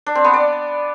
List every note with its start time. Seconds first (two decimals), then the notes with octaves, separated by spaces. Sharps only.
0.07 D4
0.15 C4
0.24 B3
0.33 D5